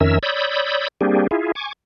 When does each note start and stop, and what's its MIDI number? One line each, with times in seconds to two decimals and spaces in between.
0.01 0.19 41
0.01 0.19 51
0.01 0.19 61
0.01 0.19 70
0.01 0.19 76
0.01 0.19 88
0.23 0.88 73
0.23 0.88 74
0.23 0.88 83
0.23 0.88 87
0.23 0.88 88
0.23 0.88 91
1.01 1.27 55
1.01 1.27 58
1.01 1.27 60
1.01 1.27 62
1.01 1.27 67
1.01 1.27 68
1.31 1.52 64
1.31 1.52 65
1.31 1.52 68
1.55 1.73 80
1.55 1.73 85
1.55 1.73 86